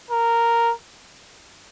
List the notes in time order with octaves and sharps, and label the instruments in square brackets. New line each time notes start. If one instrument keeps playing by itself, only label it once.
[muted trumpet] A#4